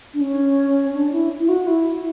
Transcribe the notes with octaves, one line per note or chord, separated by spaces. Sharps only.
D4
C#4
D4
E4
E4
F#4
E4